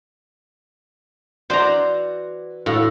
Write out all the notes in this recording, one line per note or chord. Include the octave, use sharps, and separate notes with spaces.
E3 F#4 C5 D5 A#5
A2 F#4 F5